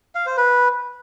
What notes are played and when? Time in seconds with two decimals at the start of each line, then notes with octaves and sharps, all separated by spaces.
0.15 F5
0.26 C5
0.37 B4